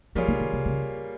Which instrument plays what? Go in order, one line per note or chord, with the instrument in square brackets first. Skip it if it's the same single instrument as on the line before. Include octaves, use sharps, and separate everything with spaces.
[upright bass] F3 [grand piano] G3 A#3 F4 G#4 C#5
[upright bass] D#3
D#3
C3
C#3